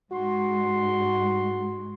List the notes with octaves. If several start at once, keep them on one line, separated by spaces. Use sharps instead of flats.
G#2 G#3 F#4 C6